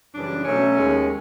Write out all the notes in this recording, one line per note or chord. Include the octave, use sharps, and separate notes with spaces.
F#2 C#3 E3 G3 D4
B2 F#3 A3 C#4
D#2 D#3 G#3